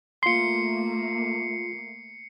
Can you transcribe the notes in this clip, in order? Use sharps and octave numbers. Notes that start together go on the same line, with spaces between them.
A3 A#3 F4 C6 C7 C#7